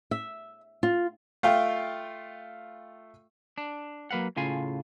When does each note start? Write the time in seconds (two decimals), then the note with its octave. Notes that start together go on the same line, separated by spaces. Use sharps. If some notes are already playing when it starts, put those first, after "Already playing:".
0.11 E5
0.83 F4
1.43 A3 F4 F5 G5
3.58 D4
4.11 F#3 A#3 B4 F5 F#5
4.37 A2 C#3 F4 G#5 C6